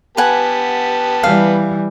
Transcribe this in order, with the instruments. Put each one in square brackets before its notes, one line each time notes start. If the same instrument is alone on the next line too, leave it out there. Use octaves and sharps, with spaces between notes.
[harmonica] B3 G4 A5 [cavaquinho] B4 F#5 G#5
[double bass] E3 G3 [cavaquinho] F5